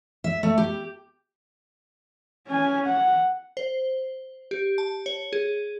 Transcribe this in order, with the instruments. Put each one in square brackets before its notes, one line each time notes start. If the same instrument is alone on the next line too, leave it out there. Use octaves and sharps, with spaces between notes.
[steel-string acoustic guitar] E5
A3
G4
[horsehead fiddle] C#4 G#5
F#5
[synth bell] C5
G4
A5
C#5
G#4